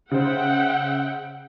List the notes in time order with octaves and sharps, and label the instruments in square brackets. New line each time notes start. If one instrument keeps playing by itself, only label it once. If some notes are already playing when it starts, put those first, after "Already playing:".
[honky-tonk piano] C#3 C5 [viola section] E5 F#5 G5